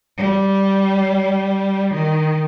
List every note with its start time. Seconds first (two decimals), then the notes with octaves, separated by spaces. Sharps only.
0.17 G3
1.93 D#3